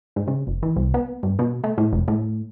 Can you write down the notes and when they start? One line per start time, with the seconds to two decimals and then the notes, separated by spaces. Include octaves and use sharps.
0.16 G#2
0.27 C#3
0.47 F#1
0.63 E3
0.76 C2
0.94 B3
1.23 G2
1.39 B2
1.64 A3
1.78 A2
1.92 F1
2.08 A2